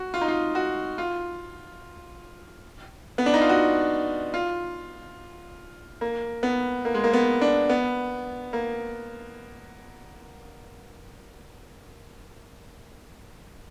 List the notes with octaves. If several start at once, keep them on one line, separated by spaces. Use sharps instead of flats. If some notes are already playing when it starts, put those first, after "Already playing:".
Already playing: F#4
F4
D#4
F4
F#4
F4
B3
D4
D#4
F4
F#4
F4
A#3
B3
A#3
G#3
A#3
B3
D4
B3
A#3